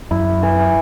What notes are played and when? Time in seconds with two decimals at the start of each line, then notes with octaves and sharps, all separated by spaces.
0.11 F#2 E4
0.43 E3